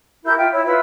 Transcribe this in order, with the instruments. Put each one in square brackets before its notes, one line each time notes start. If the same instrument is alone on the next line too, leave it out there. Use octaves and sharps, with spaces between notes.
[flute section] E4 G4 A#4 G6
F4 E5 G5
E4 C#5
E4 F4 B4 E6